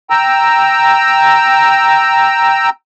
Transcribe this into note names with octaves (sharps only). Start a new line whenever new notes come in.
G5 A#5 E6